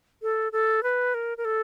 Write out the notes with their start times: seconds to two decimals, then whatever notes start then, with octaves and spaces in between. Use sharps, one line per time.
0.22 A4
0.52 A4
0.83 B4
1.14 A#4
1.38 A#4
1.45 A4